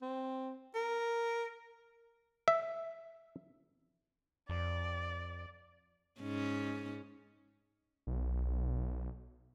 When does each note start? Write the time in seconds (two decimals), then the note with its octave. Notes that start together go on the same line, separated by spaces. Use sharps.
0.02 C4
0.75 A#4
2.48 E5
4.49 F2 D5
6.21 G#2 C#4
8.07 B1